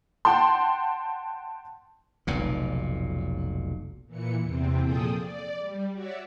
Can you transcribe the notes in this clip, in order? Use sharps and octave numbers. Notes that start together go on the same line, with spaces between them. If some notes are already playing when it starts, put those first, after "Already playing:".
F#5 G5 A5 C6
F1 B1 A#2
A#2 E3 C#7
E2 C3 C4
A#2 F3 G#4 A4 G5 D#6
D5
G3
F#4 C#5 D5 E5